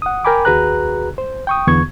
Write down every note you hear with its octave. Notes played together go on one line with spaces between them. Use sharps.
F#5 D#6
A#4 G5 G#5 B5 D6
D#2 F#4 G#4 B4 A#5 F#6
C5
G5 C#6 D#6
E2 D3 B3 C#6 G#6